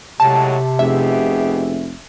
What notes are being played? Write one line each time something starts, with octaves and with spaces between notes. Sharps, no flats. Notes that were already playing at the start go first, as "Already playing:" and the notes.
A2 C3 F#3 G#3 A5
F1 B2 G4 G#4 E5